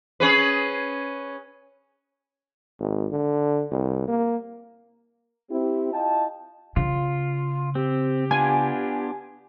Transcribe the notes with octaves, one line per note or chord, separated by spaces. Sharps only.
C#4 G#4 B4
G#1
D3
C2
A#3
C4 E4 G4
E4 F4 D#5 G5 A5
C#3 F4
C4 G4
B3 D4 F4 G#5